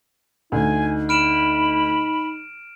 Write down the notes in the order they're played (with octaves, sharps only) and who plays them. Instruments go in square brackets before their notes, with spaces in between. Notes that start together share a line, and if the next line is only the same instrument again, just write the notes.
[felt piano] D2 [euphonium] D#4 [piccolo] G#5
[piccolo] B5 [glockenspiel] F6 D7 E7